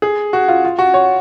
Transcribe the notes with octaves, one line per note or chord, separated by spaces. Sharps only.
G#4
F#4
F4
F4
F#4
C#5